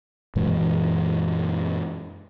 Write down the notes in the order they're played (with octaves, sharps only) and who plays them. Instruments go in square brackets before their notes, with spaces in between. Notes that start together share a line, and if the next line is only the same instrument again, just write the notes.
[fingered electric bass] F#2 A#2 E3 G#3